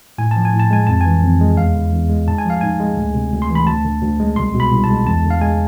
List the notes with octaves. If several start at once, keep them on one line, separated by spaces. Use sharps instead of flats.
A2 G#5
F3 A5
G#5
A2
A5
G#3 G#5
F2 A5
E3 G#5
F2
G#3
E2 F5
D3
E2
G#3
G#2 A5
G#5
F3 F5
G#2 G#5
G#3
D2
C3
D2
C6
E3
B5
D2 A5
D3
D2
G#3
C2 C6
B2
B5
C2
A5
G#3
E2 A5
D3
F5
G#3 G#5